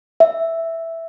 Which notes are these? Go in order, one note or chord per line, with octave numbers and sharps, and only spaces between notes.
E5